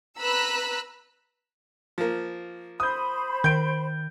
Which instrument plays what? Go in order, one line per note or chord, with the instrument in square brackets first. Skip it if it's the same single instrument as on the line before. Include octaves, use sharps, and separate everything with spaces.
[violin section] B4 A#5 B5 E6 F#6
[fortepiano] F3 A#3
[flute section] C5 B5 [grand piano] D#6 G6
[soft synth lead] D#3 [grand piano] G6 D7